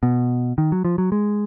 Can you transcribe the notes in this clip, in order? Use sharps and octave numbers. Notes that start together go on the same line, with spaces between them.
B2
D#3
F#3
F3
F#3
G#3